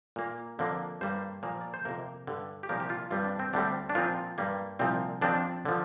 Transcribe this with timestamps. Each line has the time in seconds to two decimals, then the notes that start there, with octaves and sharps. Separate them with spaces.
0.16 A#2 A#3
0.59 F2 D3 F3 A#3
1.01 G2 G3 A#3 C5
1.43 A#2 F3 A#3
1.61 D5
1.74 C5
1.85 F2 C3 A#3 A#4
2.27 G2 D3 G3
2.63 G4
2.69 C2 A#2 F3 A#3 A#4
2.80 G4
2.90 F4
3.11 G2 G3 C4 F4
3.24 D4
3.39 C4
3.53 D2 D3 G3 C4 D4
3.89 D4
3.95 A#2 F3 C4 F4
4.38 G2 G3 A#3
4.79 C2 A#2 F3 C4
5.21 F2 F3 C4 D4
5.65 D3 F3